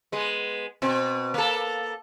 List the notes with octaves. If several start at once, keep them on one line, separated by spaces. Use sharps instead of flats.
G#3 B3
B2 C4
A#3 A4